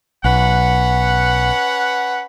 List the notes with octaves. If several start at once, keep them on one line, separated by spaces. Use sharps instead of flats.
B1 C#4 B4 F#5